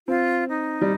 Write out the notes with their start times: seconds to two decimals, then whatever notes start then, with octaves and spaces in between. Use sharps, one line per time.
0.08 C4 F4
0.49 D#4
0.81 G3